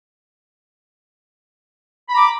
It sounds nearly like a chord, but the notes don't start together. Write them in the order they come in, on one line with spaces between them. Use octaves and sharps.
B5 A#5 D6